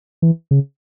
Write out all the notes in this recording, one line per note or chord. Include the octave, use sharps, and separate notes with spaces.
E3
C#3